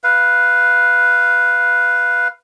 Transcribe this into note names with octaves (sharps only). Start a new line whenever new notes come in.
B4 F5